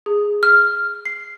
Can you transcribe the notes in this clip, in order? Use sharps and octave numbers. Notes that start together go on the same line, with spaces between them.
G#4
F6
C7